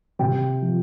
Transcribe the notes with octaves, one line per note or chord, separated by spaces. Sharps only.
C3 G5
F3